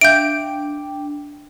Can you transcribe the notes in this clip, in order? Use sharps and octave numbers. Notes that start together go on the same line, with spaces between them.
D4 E5 F5 G5 G6 D7